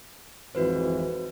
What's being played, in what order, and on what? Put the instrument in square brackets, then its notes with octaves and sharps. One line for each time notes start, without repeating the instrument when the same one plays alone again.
[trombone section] G#1 F2 E3 [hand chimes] F#4 B4 C5